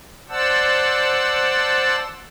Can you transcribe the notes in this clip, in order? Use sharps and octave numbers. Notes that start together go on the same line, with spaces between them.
C5 D5 F#5 A5 E6